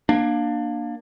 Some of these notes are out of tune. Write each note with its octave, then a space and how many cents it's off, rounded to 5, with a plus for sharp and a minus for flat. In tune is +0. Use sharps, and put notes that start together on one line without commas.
A#3 +15 D4 +20